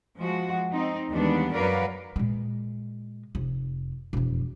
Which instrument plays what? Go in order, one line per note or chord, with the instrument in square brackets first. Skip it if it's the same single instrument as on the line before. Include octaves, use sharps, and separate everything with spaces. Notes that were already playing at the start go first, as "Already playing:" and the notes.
[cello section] F3 G#3 F#4
C4 D#4
D#2 E3 G3 G#3 B3 D4
F#2 F#3 A#4 B4 D5 F5
[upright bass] A#2 G#3
F1
E1 F2